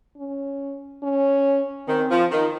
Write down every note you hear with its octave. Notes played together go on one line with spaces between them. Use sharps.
C#4
C#4
D#3 C4
F3
D#3